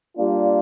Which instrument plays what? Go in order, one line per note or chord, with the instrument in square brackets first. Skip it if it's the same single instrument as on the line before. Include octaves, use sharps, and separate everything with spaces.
[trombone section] G3 A#3 D4 F4